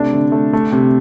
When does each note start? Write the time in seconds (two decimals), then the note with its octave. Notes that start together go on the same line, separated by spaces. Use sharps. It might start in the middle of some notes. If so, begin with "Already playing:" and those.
Already playing: C3 A3 D4
0.13 D3
0.32 A3
0.53 A3
0.72 C3